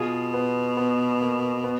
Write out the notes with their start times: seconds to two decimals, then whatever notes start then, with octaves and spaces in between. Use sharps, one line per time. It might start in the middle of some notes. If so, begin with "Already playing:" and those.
Already playing: B2 F4 G#4
0.34 B3
0.77 B3
1.21 A#3
1.64 B3